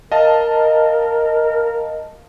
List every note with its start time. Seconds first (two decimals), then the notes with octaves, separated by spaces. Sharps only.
0.11 A#4 D#5 F5 A5